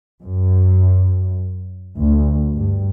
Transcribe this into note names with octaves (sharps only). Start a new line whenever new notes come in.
F#2
D2
G2